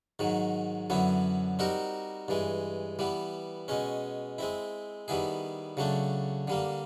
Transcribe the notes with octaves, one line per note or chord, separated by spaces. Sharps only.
G#2 D#3 F#3
F#2 D3 F#3 B3 E4
G3 C4 D#4 F#4 A#4
G2 E3 G#3
E3 G3 B3
B2 G#3 C#4
G#3 C4 E4
D#3 G3 B3 E4 G#4
C#3 F#3 A3 D4
D3 G3 A#3